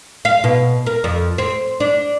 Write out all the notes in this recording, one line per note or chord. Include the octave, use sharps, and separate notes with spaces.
F5
B2
A#4
F2
C4
D4